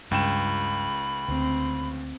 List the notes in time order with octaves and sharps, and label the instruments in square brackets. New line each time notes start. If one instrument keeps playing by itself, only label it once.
[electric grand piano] C#2 G5 E7 [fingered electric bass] G2 [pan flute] B5
[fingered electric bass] D2 [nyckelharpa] C4